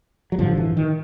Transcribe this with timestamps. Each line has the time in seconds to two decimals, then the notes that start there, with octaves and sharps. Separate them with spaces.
0.32 F#3
0.39 A1 G2 D3 F3
0.57 E3
0.77 D#3